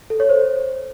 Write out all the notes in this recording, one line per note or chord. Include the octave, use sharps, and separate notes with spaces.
A4
C#5
C5